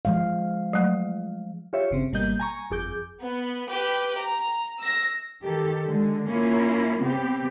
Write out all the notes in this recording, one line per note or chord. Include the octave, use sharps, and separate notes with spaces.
F3 G#3 F5
F#3 A3
F4 G4 C#5 E5
G1 C#3 C4
G#1 B2 G3 A#3 D#5 G6
G#5 A#5 C#6
G1 F2 G#4 D6 G6
B3
G4 B4
A#5
E6 A#6
D#3 G4 A4
D3 G#3
A#3 C#4 E4 F4
C#3 B3 C4 G4